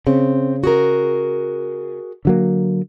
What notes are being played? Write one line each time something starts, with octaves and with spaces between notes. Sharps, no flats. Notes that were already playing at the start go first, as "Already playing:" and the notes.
C#3 C4
F#4 G#4 A#4
D3 F#3 A#3